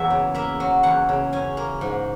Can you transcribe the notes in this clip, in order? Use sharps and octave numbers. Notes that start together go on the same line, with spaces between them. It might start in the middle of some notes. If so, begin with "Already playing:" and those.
Already playing: E2 F#3 A#3 E5
C#3
A#3 E5
F#3
E2 F#5
C#3
C#4 G#5
A#3
G#2